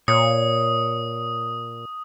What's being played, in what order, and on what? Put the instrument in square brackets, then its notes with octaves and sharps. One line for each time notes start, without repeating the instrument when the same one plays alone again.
[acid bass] A#2 [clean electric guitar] C#5 [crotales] D#6